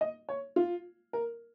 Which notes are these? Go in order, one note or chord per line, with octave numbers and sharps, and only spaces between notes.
D#5
C#5
F4
A#4